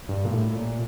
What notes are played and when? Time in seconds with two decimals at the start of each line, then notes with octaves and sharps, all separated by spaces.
0.09 G2
0.25 A#2
0.32 A2
0.55 A#2